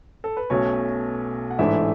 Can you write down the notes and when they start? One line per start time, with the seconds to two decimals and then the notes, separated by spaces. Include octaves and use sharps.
0.24 A4
0.37 B4
0.50 B1 B2 A3 C#4 C#5
1.50 F#5
1.59 A1 G#2 E3 A3 D4 E4 E5